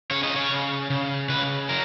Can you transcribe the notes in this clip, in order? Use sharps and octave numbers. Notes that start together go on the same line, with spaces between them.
C#3 C#5
D#5
C#5
C#3
C#3
C#3 B4
F#3 A#4